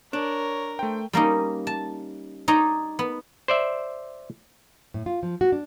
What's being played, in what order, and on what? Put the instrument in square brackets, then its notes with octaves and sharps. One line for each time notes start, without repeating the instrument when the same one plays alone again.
[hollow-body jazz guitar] D4 [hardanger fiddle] A#4 [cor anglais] C#5
[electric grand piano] A3 G5 [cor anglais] C5
[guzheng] G3 A#3 C#4 D#4
A5
D#4 C#5 D5 A#5
B3
[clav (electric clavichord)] C5 D5 E5
[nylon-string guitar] A2
F4
F3
F#4
D4